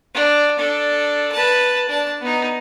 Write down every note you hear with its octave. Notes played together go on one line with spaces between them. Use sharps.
D4
D4 A4
B4 A5
D4 A5
B3 D#4